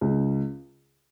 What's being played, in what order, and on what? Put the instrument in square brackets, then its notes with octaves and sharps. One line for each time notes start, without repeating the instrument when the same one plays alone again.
[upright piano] C#2